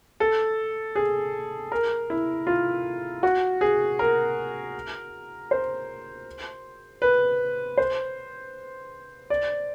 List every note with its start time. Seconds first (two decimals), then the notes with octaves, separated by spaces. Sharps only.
0.20 A4
0.95 G#4
1.72 A#4
2.10 E4
2.47 F4
3.23 F#4
3.61 G#4
3.99 A#4
5.51 C5
7.02 B4
7.78 C5
9.30 D5